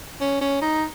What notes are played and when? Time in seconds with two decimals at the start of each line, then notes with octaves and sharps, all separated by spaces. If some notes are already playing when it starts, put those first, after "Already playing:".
0.21 C#4
0.41 C#4
0.61 D#4